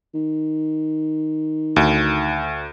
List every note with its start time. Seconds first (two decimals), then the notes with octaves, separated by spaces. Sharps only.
0.15 D#3
1.76 D2